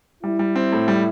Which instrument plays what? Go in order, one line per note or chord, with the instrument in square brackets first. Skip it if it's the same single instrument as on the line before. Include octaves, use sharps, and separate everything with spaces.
[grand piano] G3 [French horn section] E4
[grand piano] G3
C4
A2
G3